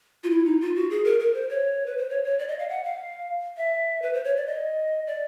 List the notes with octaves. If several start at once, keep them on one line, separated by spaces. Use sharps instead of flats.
F4
E4
D#4
F4
F#4
G#4
A#4
A#4
C5
C#5
B4
C5
C#5
C#5
D5
D#5
F5
F#5
F5
E5
B4
C5
C#5
D5
D#5
D5